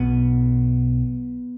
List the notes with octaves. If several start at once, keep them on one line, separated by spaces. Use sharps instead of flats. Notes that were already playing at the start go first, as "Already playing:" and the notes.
Already playing: B1 B2 B3